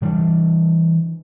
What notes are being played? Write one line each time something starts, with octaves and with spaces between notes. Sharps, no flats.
E3 G3 A#3 D4